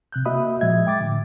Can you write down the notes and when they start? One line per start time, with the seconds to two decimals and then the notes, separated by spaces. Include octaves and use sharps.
0.12 C3 F#6 G6
0.25 A#3 F#4 D#5 E5 B5 D#6
0.61 A#2 F3 G#3 E5 G#6
0.87 G5 D6 A6
1.01 A2 D3